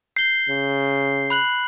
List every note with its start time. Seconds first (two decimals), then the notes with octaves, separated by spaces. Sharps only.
0.17 G6 C7 G7
0.49 C#3
1.30 B5 F#6 F#7